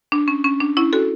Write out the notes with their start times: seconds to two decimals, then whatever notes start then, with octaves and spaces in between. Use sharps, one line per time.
0.12 D4
0.28 C#4
0.44 C#4
0.60 D4
0.77 C#4 E4
0.93 F#4 A4